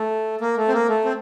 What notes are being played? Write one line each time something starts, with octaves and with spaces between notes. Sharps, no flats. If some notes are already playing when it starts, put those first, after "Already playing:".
Already playing: A3
A#3
A3
C4
A#3
A3
C4